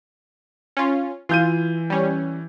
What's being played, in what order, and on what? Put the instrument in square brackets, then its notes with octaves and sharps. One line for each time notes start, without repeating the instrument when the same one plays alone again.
[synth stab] C#4 F4
[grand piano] E3 G6 D#7 [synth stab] F4
[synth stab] G3 C#4